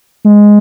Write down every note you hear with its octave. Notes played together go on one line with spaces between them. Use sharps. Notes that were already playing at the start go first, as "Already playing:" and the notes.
G#3